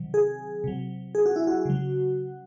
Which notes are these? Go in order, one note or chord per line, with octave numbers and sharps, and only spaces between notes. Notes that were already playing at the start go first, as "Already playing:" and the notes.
Already playing: C3 D#3 F#3
G#4
C3 F#3
G#4
F#4
E4
F#4
C#3 F#3